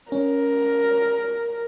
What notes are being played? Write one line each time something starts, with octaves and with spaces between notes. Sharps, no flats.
C#4 A#4